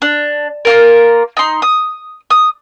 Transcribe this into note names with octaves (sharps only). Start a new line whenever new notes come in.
D4
A#3 F4 A#4
D#4 C6
D#6
D#6